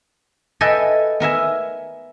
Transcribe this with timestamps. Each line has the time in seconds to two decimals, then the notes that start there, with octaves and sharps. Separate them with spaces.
0.61 A4 B4 D#5 E5 G5 G#5
1.20 B3 A#4 E5 G#5